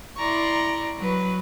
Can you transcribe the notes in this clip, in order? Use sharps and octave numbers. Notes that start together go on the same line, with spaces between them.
E4 D5 A#5 C6 C#6
F#3 B4